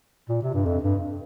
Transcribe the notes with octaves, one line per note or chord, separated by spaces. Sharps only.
A#2
C3
G2
F2
G2